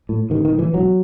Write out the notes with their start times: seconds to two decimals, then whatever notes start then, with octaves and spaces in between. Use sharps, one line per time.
0.09 A2
0.30 A1 D#3
0.45 D#3
0.52 A2
0.59 E3
0.73 E1 F#3